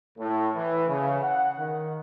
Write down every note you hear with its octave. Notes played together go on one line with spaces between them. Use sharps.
A2
E3
C#3
F#5
D#3